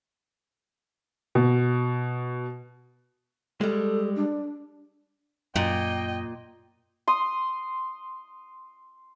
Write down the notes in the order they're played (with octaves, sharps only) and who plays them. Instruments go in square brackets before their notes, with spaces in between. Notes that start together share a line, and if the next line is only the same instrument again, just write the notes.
[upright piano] B2
[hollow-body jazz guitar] G3 G#3 [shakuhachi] A4
[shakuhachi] D4
[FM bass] F#2 [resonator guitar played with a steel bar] A#2 [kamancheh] D#5 G5
[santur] C6 D#6